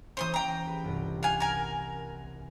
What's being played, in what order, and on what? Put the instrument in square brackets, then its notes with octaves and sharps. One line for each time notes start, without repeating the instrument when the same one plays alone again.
[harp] E3 A#3 C#4 [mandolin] C5 C6 D#6
[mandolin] G5 A#5
[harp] G4 B4
G1 C2
[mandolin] F5 G#5 [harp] F#5
[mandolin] A#4 G#5